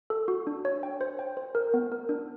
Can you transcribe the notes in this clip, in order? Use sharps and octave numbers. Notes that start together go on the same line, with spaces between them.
A4
F#4
D4
C#5
G5
C5
G5
C5
A#4
B3
A#4
D4